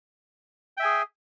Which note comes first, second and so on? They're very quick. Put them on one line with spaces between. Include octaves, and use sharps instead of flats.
G5 E5 G#5 G#4